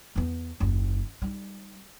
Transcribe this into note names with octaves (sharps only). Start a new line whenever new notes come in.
E2 B3
F#1 D#2
G3 D#4